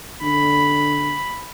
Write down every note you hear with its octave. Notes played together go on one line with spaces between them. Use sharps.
D3 B5